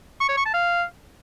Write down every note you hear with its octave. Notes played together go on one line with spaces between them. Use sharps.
C#6
C#5
C#6
A5
F5